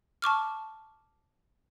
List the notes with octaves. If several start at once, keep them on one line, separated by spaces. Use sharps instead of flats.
A5 C#6 D6 F6